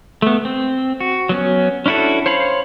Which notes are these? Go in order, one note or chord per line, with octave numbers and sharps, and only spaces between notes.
A3 B3
C4
F#4
F#3 B3 C#4
C#4 D4 E4 F#4 A4
C5 C#5 F5 B5